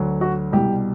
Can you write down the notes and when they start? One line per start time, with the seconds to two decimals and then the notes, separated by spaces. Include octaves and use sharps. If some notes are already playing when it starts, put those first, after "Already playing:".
Already playing: D2 D3 F#3
0.21 F#4
0.52 C2 B2 G3 G4